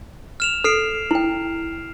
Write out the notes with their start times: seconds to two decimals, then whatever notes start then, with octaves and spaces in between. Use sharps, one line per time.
0.40 F6 E7 F7
0.64 A4 F6 C7 D7
1.11 E4 G5